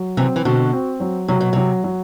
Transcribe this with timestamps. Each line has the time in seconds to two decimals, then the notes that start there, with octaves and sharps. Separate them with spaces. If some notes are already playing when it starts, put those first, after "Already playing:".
Already playing: F#3
0.17 C3 E3 C4
0.36 E3
0.45 B2 D3 F#4
0.73 C4
1.00 F#3
1.28 C3 F#3
1.41 B2
1.53 C3 F#3
1.84 F#3